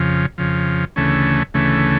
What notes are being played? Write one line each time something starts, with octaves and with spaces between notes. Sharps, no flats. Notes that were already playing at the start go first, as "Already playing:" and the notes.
Already playing: F2 C#3 F3
F2 C#3 F3
D2 C#3 E3 A3 C#4
D2 C#3 E3 A3 C#4